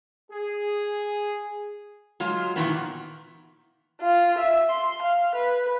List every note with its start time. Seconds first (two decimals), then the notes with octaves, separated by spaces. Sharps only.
0.31 G#4
2.20 F#3 G#3 F4
2.56 A#2 D#3 E3 B3
4.01 F4
4.38 E5
4.70 C6
5.02 F5
5.35 B4